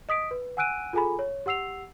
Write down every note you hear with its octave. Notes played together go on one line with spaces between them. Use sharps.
D#5 D#6 B6 D7
B4
F#5 G#5 E6 F#6 D7 D#7
F4 G#4 A4 G#5 A#5 B5
C#5
G4 F#5 E6 C7 F7